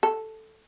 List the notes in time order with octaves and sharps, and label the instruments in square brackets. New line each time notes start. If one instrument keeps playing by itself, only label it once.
[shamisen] A4